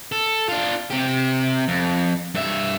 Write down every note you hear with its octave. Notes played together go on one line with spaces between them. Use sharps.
A4
D4 F4
C3 G4
F2
G2 E5